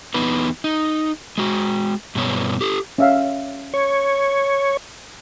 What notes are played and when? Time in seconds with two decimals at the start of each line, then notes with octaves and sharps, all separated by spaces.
0.14 E2 B3 D#4 B4
0.64 D#4
1.38 G#3 F#4
2.15 G2 B2 B3 C#5
2.61 G4 A4
2.98 C#4 E5 F5
3.74 C#5